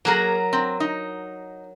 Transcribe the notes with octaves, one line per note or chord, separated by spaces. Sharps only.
F#3 A#3 G#4 A#4 F#5
C4
D#4